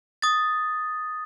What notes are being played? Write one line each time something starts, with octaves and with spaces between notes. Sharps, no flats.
D#6 A6